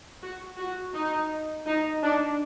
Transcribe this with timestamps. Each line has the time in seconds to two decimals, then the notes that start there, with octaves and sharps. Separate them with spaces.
0.23 F#4
0.59 F#4
0.95 D#4
1.67 D#4
2.03 D4